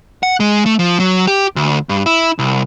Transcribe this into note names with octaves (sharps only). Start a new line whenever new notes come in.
F#5
G#3
A3
F3
F#3
G4
D2
G2
E4
C2